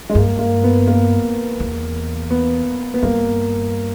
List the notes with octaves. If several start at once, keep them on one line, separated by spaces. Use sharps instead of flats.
G#3
G2 A#3
A#3
B3
A#3
E2
B3
B3
G2 A#3